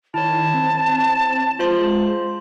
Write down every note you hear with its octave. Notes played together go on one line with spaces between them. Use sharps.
D#3 E4 C#5 A5
C4
G#3 F4 C5 C6